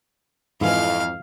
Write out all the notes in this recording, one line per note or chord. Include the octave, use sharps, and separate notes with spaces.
F2 G#2 E3 E4 D#5 F5 G#5 F6